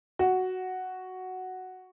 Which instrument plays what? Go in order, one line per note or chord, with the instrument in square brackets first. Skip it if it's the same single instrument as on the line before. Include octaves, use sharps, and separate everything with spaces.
[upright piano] F#4